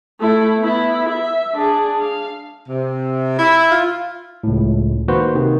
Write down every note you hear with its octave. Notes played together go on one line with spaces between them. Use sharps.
A3 E4
B3 E4
E5
D4 G#4
F5
C3
E4
F4
C#2 A2
D#3 A#3 F#4 B4 C5
C3 D#3